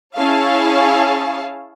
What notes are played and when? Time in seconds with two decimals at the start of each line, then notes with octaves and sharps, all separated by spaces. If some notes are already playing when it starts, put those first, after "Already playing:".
0.17 C#4 E4 G#4 C#5 F5 A5